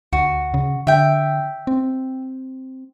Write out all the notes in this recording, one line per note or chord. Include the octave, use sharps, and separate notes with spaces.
D2 F#4
C#3
D3 E5 G5
C4